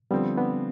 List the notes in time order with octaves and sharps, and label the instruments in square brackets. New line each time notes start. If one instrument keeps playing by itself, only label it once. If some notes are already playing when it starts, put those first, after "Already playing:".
[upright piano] D3 F3 C4 [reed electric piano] G3 B3
[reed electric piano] B3 D4